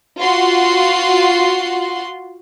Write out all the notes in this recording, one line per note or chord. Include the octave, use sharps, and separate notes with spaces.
F4 F#4 C6